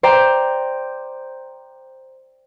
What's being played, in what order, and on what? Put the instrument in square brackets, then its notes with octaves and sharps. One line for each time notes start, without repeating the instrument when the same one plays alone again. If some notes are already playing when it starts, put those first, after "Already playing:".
[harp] C5 D5 G5 A#5